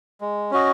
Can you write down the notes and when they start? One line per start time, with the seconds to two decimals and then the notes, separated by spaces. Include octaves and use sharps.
0.21 G#3
0.51 C#4 F#4 D#5